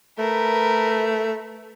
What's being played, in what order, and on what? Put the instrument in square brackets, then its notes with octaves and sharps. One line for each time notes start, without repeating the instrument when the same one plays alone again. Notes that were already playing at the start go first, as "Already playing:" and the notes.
[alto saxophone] A3 [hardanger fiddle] A#4 B4